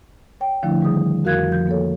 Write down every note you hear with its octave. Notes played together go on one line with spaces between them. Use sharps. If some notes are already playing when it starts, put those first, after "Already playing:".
C#5 G5
D3 F3 A3 D4 E4
D#3 G3 G#4 D#6
F2 F#4 A#4 F5 F#6 G#6
F3 G6
A#3 A4 C#5